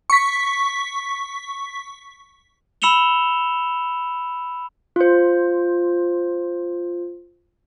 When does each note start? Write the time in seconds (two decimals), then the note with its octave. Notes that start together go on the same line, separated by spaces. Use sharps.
0.10 C#6 B6
2.82 B5 E6 C#7 E7 F7 G7
4.96 F4 C5